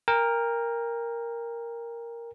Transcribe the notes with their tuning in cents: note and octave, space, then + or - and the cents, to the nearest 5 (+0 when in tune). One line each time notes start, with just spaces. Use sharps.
A#4 +0 G5 +40